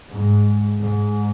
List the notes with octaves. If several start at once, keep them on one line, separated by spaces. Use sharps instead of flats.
G#2
G#2